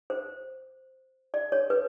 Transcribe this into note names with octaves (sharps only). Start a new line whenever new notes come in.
C5
D5
C#5
B4